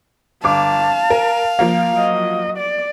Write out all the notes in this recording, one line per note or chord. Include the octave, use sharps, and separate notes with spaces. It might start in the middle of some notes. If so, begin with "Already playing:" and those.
G1 F5 A5 D6
A#4
F3 A#3
F#3 D#5
D5